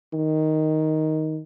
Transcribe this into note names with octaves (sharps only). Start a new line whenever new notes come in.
D#3